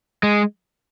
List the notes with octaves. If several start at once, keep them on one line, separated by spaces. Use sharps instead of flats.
G#3